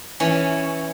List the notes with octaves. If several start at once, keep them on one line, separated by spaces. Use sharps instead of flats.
E3 C#4